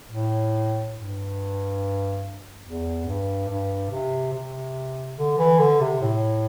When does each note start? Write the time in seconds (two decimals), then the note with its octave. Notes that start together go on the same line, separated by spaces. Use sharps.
0.10 A2
0.94 G2
2.63 E2
3.06 G2
3.48 G2
3.90 C3
4.32 C3
5.17 D3
5.38 E3
5.59 D3
5.81 C3
6.02 A2